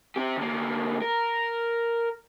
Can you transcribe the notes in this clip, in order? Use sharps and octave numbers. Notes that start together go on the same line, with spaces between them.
C4 G4
D2 A#3
A#4